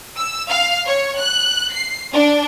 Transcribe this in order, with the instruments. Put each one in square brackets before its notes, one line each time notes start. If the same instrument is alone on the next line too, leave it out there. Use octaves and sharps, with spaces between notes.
[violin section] E6
F5
C#5
F#6
C7
D4